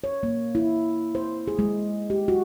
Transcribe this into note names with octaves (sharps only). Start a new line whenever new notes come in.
C#5
A#3
E4
C5
G#4
G#3
G4
F#4